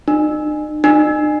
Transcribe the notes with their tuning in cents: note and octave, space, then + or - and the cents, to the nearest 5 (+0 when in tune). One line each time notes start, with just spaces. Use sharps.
D#4 -45
D#4 -45